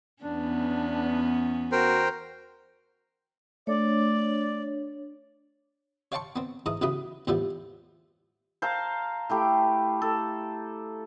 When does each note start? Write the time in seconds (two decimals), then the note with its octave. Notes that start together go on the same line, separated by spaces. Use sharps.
0.23 E2 B3 C#4 D4
1.72 F#4 A#4 C5 G5
3.67 A3 D4 C#5 D5
6.12 C#5 F5 G5 A5 C6 C#6
6.36 B3 C4
6.66 G#2 E3 A#5 D#6
6.81 B1 C#3 E3 F#3 B5 D#6
7.27 E2 A2 E3 F3 G3 B3
8.62 C5 F5 A5 A#5
9.30 A3 E4 G4
10.02 A4